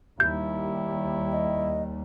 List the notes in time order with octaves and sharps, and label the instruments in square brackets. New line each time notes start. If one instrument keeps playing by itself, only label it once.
[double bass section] D#2 G3 [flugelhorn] E4 [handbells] G6
[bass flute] D#5